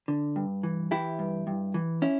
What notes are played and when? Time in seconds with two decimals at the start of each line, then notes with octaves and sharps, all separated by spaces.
0.08 D3
0.36 G2
0.63 E3
0.91 E3 E4 G4
1.19 G2
1.47 G2
1.74 E3
2.02 C#4 E4